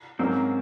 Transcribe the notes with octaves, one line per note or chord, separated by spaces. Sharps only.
G#2 F#3 A#3 C4 C#4